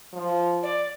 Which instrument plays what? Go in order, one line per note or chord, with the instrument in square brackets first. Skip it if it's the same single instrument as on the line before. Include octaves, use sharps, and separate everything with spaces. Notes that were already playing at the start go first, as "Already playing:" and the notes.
[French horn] F3
[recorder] D5